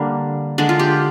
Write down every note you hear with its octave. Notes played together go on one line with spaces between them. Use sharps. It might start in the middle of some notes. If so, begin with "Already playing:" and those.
Already playing: D3 G3 A#3 D4
D3 G#3 D4
F4
G4